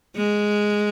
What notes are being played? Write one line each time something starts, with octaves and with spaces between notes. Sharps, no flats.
G#3